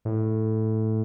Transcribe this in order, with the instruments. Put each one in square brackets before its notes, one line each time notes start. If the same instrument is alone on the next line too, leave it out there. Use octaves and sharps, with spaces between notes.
[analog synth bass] A2